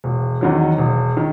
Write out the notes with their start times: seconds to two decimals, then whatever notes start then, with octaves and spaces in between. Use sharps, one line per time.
0.04 E1
0.41 E2 D#3 F#3
0.78 E1
1.17 D#3